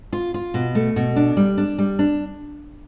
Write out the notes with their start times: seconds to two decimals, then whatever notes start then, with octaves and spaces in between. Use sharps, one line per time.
0.13 F4
0.34 F4
0.54 B2
0.75 A3
0.96 B2
1.16 D4
1.37 G3
1.57 D4
1.78 G3
1.99 D4